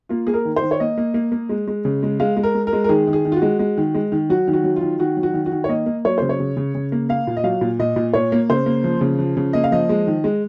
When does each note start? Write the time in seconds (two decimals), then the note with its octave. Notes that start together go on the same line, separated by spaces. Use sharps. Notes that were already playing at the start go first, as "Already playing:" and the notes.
0.09 A#3 F4
0.27 A#3 G#4
0.34 A#4
0.45 D#3
0.56 C5
0.62 D#3
0.71 C#5
0.80 A#3 D#5
0.98 A#3
1.14 A#3
1.32 A#3
1.49 G#3
1.68 G#3
1.85 C#3
2.03 G#3
2.20 G#3 F5
2.37 G#3
2.43 A#4
2.55 G#3
2.67 A#4
2.73 G#3
2.84 A#4
2.89 D#3 G#4
3.07 D#3
3.13 G#4
3.25 D#3
3.32 F4
3.36 F#4
3.42 G#3
3.59 G#3
3.77 D#3
3.95 G#3
4.12 D#3
4.29 F#3 F#4
4.48 D#3
4.53 F#4
4.64 F#3
4.76 F4
4.81 D#3
4.99 D#3 F#4
5.17 F#3
5.23 F#4
5.34 D#3
5.46 F#4
5.52 D#3
5.64 C#5
5.69 A#3 D#5
5.86 A#3
6.05 F#3 C#5
6.18 C#3 C5
6.29 C#5
6.40 C#3
6.57 C#3
6.75 C#3
6.92 A#3
7.09 A#3 F5
7.27 A#2
7.37 D#5
7.44 F#3 F5
7.61 A#2
7.79 A#2 D#5
7.96 A#2
8.13 A#2 C#5
8.32 A#3
8.50 C#3 C5
8.66 A#3
8.84 F3
9.01 C#3
9.19 F3
9.37 C#3
9.53 A#3 D#5
9.64 F5
9.72 F3 D#5
9.89 G#3
10.07 D#3
10.24 G#3